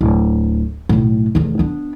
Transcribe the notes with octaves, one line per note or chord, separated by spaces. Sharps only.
D1
B1 A2
F1 E2
B3 D4